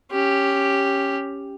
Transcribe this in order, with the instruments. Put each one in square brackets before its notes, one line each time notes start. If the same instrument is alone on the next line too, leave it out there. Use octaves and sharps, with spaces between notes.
[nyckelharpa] C#4 G4